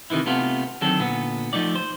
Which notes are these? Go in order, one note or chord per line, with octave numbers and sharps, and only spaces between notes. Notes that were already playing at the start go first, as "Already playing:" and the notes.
C3 D#3 E3 E4
C3 A3 B3 F4
D3 D#3 F#3 C4 A4
A#2 D3 B3
F3 A3 D#4 D5
C5